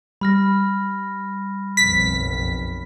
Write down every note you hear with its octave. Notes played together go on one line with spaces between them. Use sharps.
G3 B5 F6 A#6
F#1 B1 F2 B6